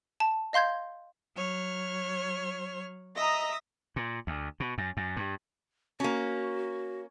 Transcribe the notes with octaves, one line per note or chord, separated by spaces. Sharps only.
A5
D#5 F5 C6 G6 G#6
F#3 C#5 F6
D#5 E5 A#5 D#6 A#6
A#2
D2
B2
F#2
F#2
G2
A#3 C#4 F#4